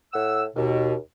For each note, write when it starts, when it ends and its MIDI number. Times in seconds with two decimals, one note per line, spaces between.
0.13 0.44 45
0.13 0.44 78
0.13 0.44 88
0.56 0.95 39
0.56 0.95 47